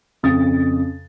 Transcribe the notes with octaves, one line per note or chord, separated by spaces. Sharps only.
F2 C#3 D#6 A6